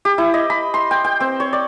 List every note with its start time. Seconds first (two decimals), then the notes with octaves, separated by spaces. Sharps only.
0.05 G4
0.18 E4
0.34 D#5
0.50 B5
0.74 C6
0.91 G5
1.04 G5
1.20 C4
1.40 C#5
1.53 D5